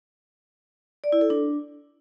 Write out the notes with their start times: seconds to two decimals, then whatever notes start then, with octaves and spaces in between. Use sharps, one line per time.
1.04 D5
1.12 E4
1.21 A4
1.30 D4